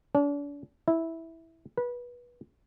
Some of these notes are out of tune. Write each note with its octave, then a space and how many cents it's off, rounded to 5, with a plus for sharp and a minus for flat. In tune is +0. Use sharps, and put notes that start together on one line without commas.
D4 -40
E4 -10
B4 -20